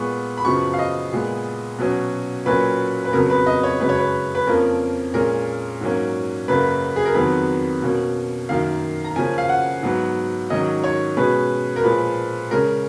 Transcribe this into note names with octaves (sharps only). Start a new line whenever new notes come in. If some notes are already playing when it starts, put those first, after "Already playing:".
Already playing: A#2 G#3 B3 C#6
B5
F#2 C#3 F3 B3 C#6
F5
D#5
A#2 G#3 B3
B2 F#3 C#4
A#2 F#3 A#3 C#4 B4
B4
F2 C#3 F#3 B3 A#4
B4
D#5
C#5
F#2 C#3 G#3 B4
C#5
B4
B4
F2 F3 A#3 C#4 A#4
A#2 G#3 C#4 A#4
G#2 F#3 A#3 C#4
F#2 C#3 F#3 A#3 B4
G#4
A#4
F2 D#3 F#3 B3 B4
B2 A#3 C#4
F#2 D#3 A#3 F5
A#5
C#3 F3 A#3 C#4 G#5
F5
F#5
G#2 F#3 B3
G#2 D#3 F#3 C#4 D#5
C#5
B2 G#3 C#4 B4
A#4
A#2 F3 G#3 B4
C#3 G#3 C#4 A#4